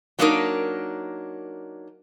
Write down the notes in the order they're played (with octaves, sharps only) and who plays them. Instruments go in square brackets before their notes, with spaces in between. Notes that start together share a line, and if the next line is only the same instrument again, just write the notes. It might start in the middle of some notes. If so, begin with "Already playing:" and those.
[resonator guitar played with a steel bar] F#3 A#3 D4 D#4 A#4